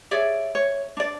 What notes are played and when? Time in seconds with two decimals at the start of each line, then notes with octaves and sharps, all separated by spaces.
0.11 G#4 C#5 D5 E5
0.55 C#5
0.97 D4 D5